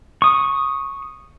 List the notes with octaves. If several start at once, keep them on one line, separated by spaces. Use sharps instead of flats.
C#6 D#6